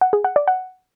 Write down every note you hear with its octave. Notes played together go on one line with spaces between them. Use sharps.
F#5
G#4
F#5
D5
F#5